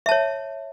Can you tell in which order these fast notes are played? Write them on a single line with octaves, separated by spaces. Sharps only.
E5 A5 C#5